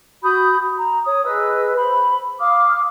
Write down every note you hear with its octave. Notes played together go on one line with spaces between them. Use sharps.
F#4 B5 D#6 G6
A#5
C#5 D#6
G#4 B4 D#5 E6
C5 B5
F5 D6 D#6 F6